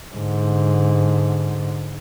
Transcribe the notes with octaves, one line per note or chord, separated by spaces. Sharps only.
G#2 D3